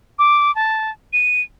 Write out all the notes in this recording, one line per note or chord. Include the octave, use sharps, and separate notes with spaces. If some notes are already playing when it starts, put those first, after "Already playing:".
D6
A5
D#7